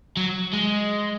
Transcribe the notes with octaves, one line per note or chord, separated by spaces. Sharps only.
F#3
G#3